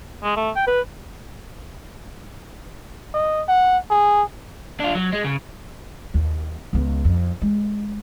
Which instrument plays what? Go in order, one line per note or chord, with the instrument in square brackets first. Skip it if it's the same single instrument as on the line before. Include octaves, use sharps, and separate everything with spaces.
[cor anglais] G#3
A3
G5
B4
[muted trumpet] D#5
F#5
G#4
[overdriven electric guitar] D4 F4
F#3
G#3
C#3
[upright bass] D#2
C#2 B3
F2
G#3